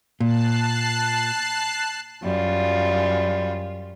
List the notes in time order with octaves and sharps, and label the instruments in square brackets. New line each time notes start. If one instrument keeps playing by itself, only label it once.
[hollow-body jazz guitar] A#2 [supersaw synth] A5 F#6 C7
[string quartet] F#2 G3 F4